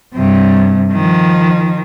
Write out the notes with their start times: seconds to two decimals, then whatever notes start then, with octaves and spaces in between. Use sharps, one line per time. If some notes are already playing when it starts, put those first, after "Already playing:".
0.15 G2 C3
0.92 D#3 F3